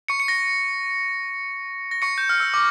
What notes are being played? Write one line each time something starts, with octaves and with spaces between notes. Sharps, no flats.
C#6 C#7
C#7
A#6
A#6
C#6 C#7
G6
F6
E6
D6